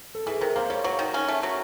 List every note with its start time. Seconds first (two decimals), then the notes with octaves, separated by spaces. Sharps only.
0.15 A4
0.26 E3 G#4
0.41 C3 A#4
0.56 A#3 C5
0.70 G3 C#5
0.84 F#3 C#5
0.99 D#3
1.14 C#4
1.28 A3
1.43 F#3